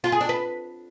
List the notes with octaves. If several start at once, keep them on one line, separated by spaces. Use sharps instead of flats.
F4
G#4
D4
B4